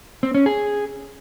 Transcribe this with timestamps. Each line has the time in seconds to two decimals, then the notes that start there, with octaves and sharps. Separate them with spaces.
0.23 C4
0.35 C#4
0.46 G#4